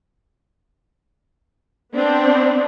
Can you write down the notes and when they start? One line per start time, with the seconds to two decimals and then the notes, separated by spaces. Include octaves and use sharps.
1.94 B3 C4 D4